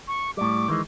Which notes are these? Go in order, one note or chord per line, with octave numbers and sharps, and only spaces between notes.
C#6
A2 G3 D6
D#3 E3 G#3